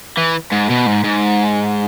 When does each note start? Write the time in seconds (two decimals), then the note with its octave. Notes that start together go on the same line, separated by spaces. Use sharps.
0.18 E3
0.52 G#2
0.69 B2
0.86 G#2
1.04 G#2